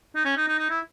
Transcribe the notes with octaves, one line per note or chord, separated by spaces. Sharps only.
D#4
C#4
D#4
D#4
D#4
E4